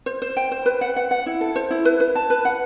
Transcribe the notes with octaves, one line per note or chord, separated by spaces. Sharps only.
C5
C5
G5
C5
B4
F#5
F#5
F#5
E4
A4
C5
E4
B4
B4
A5
B4
F#5